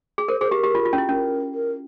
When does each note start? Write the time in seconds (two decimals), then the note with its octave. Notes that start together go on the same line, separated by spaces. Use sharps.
0.18 G#4
0.28 A#4 C5
0.40 G#4 C5
0.51 G4 A#4
0.64 G4
0.75 F4
0.85 F4
0.93 C#4
0.98 E4
1.08 C#4 A#4
1.54 A#4